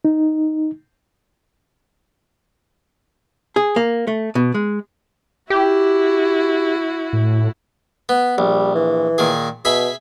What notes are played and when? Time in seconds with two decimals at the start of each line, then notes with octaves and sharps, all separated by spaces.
0.05 D#4
3.56 G#4
3.76 A#3
4.07 A3
4.35 B2
4.54 G#3
5.50 E4 F#4 G4
7.13 A2
8.09 B3
8.38 A#1 G3
8.75 E3
9.18 A#2 D#3 G#4
9.65 B2 G#4 E5 B5